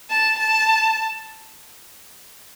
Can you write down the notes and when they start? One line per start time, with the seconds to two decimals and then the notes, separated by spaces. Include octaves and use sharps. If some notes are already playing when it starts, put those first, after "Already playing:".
0.10 A5
0.39 A5